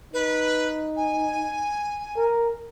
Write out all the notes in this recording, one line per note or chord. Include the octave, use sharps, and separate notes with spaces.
D#4 B4
G#5
A#4